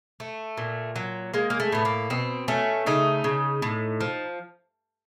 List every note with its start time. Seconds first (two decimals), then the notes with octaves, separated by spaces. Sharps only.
0.20 A3
0.58 A#2
0.96 F#3
1.34 G#3 A#3
1.50 A#3
1.60 A3
1.72 A2 B3
1.85 A#3
2.10 B2 C4
2.48 A3 C#4
2.86 C#3 D#4
3.24 C#3
3.62 A2
4.01 F3